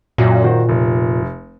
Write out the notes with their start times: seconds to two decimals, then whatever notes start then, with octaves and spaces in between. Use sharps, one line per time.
0.18 F#2 A#2
0.43 D#3 F#4 C5
0.69 F1